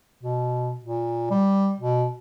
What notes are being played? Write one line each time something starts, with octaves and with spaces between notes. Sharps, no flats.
B2
A#2
G3
B2